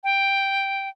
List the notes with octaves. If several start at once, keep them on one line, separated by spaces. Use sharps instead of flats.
G5